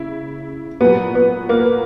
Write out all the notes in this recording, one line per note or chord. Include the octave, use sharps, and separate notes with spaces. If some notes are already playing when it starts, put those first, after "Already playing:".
Already playing: C#3 E4
A#2 F#3 B3
B3
A#3